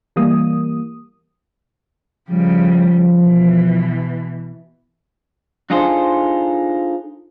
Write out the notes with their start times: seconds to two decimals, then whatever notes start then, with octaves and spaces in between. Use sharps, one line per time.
0.16 E3 G3 A#3 D#6
2.29 C#3 F3 G3
3.19 B2 E3
5.70 D4 D#4 F4 G#4 A4 C5